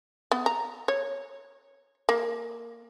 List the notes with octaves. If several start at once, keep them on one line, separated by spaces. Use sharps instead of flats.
B3
A#5
C#5
A#3